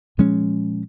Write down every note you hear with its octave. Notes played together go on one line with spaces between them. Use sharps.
A#2 F3 G#3 C#4